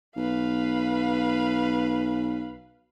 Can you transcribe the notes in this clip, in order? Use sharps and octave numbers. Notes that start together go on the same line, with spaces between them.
B1 B4 F5